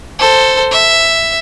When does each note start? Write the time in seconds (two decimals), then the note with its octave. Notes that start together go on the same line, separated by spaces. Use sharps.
0.19 A4 C5
0.71 E5